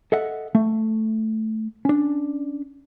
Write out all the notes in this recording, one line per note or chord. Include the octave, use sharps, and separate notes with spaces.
A4 D#5 E5 F#5
A3
C#4 D4